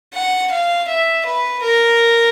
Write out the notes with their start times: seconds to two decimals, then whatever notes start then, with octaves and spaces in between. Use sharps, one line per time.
0.14 F#5
0.52 F5
0.88 E5
1.26 B4
1.62 A#4